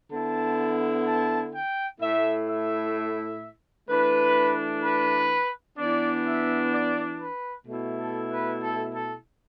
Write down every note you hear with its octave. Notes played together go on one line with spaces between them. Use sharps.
D3 B3 E4 A5
A5
G5
A2 A3 E4 E5
E5
E3 A3 D4 B4
B4
E3 B3 D4 D5
E5
D5
B4
B2 A3 E4
A4
B4
A4
A4